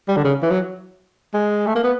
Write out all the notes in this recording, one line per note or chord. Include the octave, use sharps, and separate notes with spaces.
G3
D3
C#3
E3
F#3
G#3
A3
A#3
B3